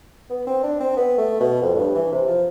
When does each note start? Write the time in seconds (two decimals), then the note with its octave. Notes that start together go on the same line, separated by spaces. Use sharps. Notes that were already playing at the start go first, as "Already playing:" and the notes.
0.30 B3
0.47 C4
0.63 D4
0.80 C4
0.97 B3
1.18 A3
1.40 B2
1.62 F2
1.74 A2
1.79 G2
1.95 E3
2.12 C3
2.28 F3